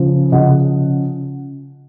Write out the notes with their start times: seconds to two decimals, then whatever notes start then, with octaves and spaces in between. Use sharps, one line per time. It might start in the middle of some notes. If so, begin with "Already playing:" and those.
Already playing: C#3 F3
0.32 C#3 F3 D#5 F#5